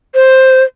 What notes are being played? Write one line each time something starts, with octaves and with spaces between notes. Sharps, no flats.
C5